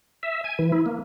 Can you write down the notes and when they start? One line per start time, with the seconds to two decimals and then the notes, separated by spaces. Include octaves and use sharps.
0.23 E5
0.44 G#5
0.59 E3
0.72 E4
0.86 A#3